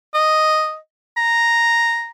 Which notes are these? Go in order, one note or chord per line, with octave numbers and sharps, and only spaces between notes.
D#5
A#5